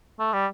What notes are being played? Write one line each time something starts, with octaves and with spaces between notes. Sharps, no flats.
A3
G3